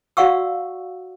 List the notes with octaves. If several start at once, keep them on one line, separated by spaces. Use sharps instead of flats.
F#4 D5 F5 F#5 C#6 E6